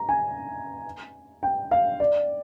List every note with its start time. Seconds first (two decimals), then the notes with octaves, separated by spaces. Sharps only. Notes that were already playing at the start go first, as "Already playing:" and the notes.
Already playing: A#5
0.09 G#5
1.43 G5
1.71 F5
2.00 D5